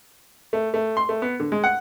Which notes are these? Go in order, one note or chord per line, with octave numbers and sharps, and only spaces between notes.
A3
A3
C6
A3
B3
D3
G#3
F#5